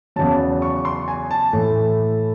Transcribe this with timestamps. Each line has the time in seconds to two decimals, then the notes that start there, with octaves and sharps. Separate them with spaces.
0.16 E2 C#3 F#3 A5
0.62 C#6
0.85 C6
1.08 G#5
1.31 A5
1.53 A2 E3 A3